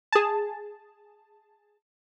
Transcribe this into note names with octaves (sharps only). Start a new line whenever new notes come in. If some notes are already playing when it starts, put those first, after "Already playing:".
G#4 A5